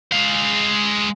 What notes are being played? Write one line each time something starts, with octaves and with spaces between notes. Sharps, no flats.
G#3 F5